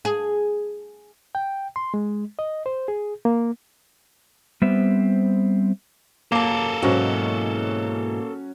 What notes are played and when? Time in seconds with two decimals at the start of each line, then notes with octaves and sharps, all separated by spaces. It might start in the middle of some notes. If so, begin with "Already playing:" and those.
0.05 G#4
1.35 G5
1.76 C6
1.94 G#3
2.39 D#5
2.66 C5
2.88 G#4
3.25 A#3
4.62 G3 B3 C4 C5 E5
6.32 F#2 A#3 A4 A#4 A5
6.82 G#2 B2 E3 F#3 C#4 F#4